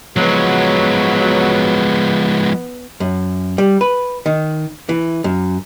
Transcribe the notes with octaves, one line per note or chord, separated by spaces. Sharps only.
F3 F#3 G#3 B3
F#2
G3
B4
D#3
E3
F#2